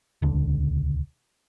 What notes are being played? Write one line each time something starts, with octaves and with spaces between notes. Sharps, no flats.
D#1 C#2 D3